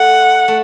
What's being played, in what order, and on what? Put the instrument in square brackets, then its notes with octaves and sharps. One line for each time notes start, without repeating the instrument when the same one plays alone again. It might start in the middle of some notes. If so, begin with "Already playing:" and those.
Already playing: [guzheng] A3 [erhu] F#5
[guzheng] A3